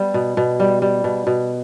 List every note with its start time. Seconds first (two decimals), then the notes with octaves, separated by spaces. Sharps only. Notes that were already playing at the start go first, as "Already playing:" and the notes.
Already playing: G3 B3
0.14 B2
0.37 B2
0.60 G3
0.82 G3
1.04 B2
1.27 B2